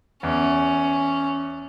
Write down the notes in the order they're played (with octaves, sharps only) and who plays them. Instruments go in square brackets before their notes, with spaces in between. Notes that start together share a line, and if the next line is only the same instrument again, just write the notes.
[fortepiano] E2 [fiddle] C#4